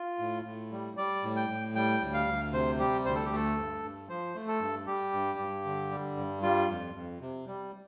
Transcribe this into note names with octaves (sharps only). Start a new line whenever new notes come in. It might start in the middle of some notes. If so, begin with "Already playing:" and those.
Already playing: F4
A2
A2
G3
G3 D5
A2
G5
A2
G3 G5
D2
F5
D2
C3 C5
G3 G4
D2 C5
A4
G4
A3 A4
G2
G2
F3 C5
A3
A4
G2
G3 G4
G2
G2
D3
G3
G2
G3 F4
F2
F2
C3
G3